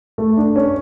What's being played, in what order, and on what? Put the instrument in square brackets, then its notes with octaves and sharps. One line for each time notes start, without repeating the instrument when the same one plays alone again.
[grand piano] A3
D4
C#4